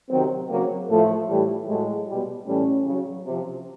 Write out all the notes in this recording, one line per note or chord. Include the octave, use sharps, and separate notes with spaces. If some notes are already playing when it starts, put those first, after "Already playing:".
C3 D#3 F#3 C4
C#3 F#3 A#3
A2 F3 A3
A2 E3 G3
A2 F#3 G#3
B2 G3
A2 E3 G3 C#4
C#3 F#3
C3 F3